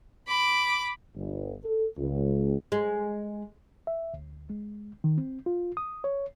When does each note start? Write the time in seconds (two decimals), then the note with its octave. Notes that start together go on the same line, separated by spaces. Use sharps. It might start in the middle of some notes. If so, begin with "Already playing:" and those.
0.27 B5 D6
1.14 G1
1.64 A4
1.98 C#2
2.72 G#3
3.87 E5
4.14 D2
4.50 G#3
5.04 D#3
5.18 C4
5.46 F4
5.77 D#6
6.04 C#5